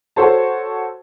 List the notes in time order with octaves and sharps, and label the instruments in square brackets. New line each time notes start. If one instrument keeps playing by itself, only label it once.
[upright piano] F#4 A4 C5 C#5 A5